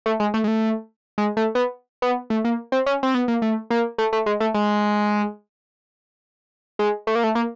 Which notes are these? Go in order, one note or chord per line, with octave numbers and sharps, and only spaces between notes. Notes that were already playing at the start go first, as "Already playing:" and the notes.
A3
G#3
A3
G#3
A3
G#3
A3
B3
B3
A3
A#3
C4
C#4
C4
B3
A#3
A3
A#3
A3
A3
G#3
A3
G#3
G#3
A3
A#3
A3
A#3